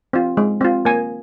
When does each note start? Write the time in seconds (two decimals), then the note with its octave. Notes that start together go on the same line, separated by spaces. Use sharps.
0.13 C4 F4
0.37 G#3
0.61 C4 F4
0.85 A#3 G#5